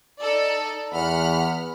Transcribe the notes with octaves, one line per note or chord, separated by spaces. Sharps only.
D#4 A4 D5
E2 F#5 B5 F6